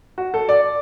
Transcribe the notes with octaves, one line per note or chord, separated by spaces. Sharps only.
F#4
A4
D5